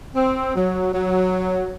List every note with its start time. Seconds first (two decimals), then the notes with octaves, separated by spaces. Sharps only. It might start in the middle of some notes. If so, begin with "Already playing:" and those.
0.15 C4
0.54 F#3
0.93 F#3